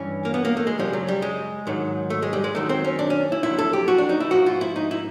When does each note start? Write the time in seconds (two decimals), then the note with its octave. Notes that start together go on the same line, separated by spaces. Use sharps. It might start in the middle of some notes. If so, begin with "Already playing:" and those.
Already playing: G2 E3 C#4
0.25 A#3
0.34 B3
0.45 A#3
0.57 A3
0.67 G#3
0.78 F#2 C#3 F3 G3
0.93 F#3
1.08 G3
1.22 G#3
1.67 G#2 D#3 F#3
2.10 A3
2.22 G#3
2.33 G3
2.44 G#3
2.55 F#2 D#3 F#3 A3
2.69 C4
2.84 C#4
2.99 D4
3.10 C#4
3.32 E4
3.43 F2 D3 F#3 E4
3.58 A4
3.73 G4
3.88 F#4
3.98 D4
4.09 D#4
4.20 E4
4.31 G#2 F3 F#4
4.46 F4
4.61 E4
4.76 D#4
4.91 E4